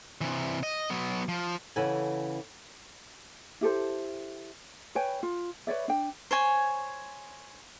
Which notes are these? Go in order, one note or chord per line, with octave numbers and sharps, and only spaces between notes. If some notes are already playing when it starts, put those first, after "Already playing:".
C3 E3
D#5
F#3 B3
F3
C#3 E3 A4 F#5 G#5
E4 G4 A4 C5
B4 C#5 G5 G#5
F4
B4 C#5 D5 E5
D4 G5
C5 C#5 G#5